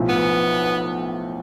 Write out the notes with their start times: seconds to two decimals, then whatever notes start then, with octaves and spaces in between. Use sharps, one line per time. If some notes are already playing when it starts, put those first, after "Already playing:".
Already playing: B1 A2 F3
0.09 B3